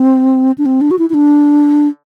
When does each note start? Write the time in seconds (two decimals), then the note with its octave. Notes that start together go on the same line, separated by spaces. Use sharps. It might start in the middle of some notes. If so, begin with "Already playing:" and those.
Already playing: C4
0.58 D4
0.66 C4
0.81 D4
0.91 F#4
0.99 E4
1.10 E4
1.14 D4